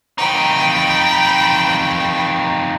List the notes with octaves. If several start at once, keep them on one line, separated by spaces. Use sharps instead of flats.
F2 D#4 G5 B5